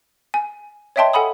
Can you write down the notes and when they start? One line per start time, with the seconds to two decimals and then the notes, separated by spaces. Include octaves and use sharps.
0.34 G#5
0.96 C#5 D#5 E5 G5 A5 C6
1.13 A4 F#5 G#5 B5 D#6